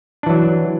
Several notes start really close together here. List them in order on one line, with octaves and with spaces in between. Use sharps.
D4 E3 F#3